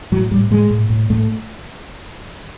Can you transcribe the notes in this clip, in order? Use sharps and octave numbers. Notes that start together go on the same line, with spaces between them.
A2 F#3
A2 G3
A2 G#3
A2
A2
A2 A3